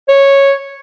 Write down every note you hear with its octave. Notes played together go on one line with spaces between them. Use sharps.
C#5